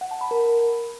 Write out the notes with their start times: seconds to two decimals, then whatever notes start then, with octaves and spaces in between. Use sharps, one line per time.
0.01 F#5
0.11 A5
0.21 B5
0.31 A#4